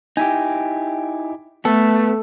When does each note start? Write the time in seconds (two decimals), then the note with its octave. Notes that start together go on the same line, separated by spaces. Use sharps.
0.17 D#4 E4 G4 G#5
1.65 A3 B3 A4